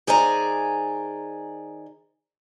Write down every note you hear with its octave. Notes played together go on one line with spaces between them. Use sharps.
D#3 G#4 C5 D5 G#5 A#5